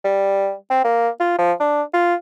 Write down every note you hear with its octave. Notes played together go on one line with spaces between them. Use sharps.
G3
C4
A#3
F4
F3
D4
F4